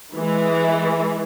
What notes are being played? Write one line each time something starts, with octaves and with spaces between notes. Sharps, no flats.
E3 G#3